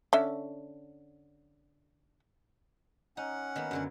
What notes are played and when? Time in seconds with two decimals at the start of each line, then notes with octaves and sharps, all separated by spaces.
0.13 D3 C#4 E5
3.17 C#4 D#4 F#5
3.56 D#3 A#3 B3
3.71 F#2 D3 F#3